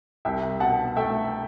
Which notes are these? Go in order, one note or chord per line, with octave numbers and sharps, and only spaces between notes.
C2 E5 G5
B2 F#5 A5
A3 E5 G5